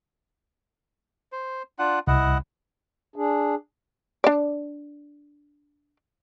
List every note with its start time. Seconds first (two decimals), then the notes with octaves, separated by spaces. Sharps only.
1.32 C5
1.79 D4 F4 F#5
2.07 C2 E4 D#5 F#5
3.16 D4 G#4
4.24 D4 D5